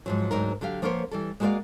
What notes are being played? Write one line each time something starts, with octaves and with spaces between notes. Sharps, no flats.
G#2 F3 F#3
D2 G#2 F#3 D#4 A#4
D3 F#3 G4 F5
F3 A#3 B3 A#4 C5 C#5
E3 G3 A4
G#3 A#3 F#4 C5 D5 F5